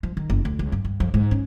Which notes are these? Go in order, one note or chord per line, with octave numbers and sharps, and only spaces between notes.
F3
D#3
F#1
D2
C#2
G2
G2
F2
G#2
C#4